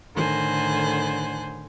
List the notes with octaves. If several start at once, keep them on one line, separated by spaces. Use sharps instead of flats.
A2 D3 D#3 C5 G#5 F#6